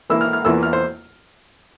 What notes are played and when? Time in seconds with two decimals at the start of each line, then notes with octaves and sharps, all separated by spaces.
0.10 E3 A#3 E4 E6
0.21 F6
0.33 F6
0.45 E2 E3 A#3 F4 E6
0.63 F6
0.73 C5